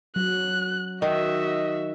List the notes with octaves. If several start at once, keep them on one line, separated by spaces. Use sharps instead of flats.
F#3 F#6
D#3 F#4 D#5 E5